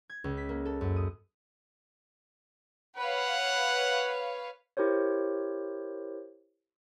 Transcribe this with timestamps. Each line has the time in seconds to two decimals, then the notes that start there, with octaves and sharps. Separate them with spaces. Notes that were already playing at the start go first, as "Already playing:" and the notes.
0.10 G#6
0.24 C#2
0.37 B6
0.49 A#3
0.66 A4
0.81 F#2
0.96 D#6
2.96 B4 C#5 F5 F#5
4.77 E4 G4 A#4 C5 C#5